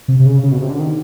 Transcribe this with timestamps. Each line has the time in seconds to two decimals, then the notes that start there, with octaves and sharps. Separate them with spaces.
0.08 C3
0.20 C3
0.26 C#3
0.43 C#3
0.52 B2
0.61 C3
0.70 D3
0.79 D#3